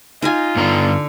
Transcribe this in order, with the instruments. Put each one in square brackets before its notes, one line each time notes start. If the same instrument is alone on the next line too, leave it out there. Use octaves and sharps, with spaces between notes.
[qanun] D#4 D#5 G#5 [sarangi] F4
[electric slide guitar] G2 B3 A#5 [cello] D3